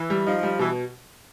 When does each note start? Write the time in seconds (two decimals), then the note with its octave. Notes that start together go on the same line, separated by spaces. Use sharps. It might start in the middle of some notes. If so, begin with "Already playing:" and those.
Already playing: E3
0.10 G3
0.27 F3 D#4
0.43 G3
0.59 B2 E3